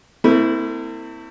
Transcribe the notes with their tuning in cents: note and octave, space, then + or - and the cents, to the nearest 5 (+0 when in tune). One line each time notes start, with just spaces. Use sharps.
A3 +45 C4 -30 E4 -15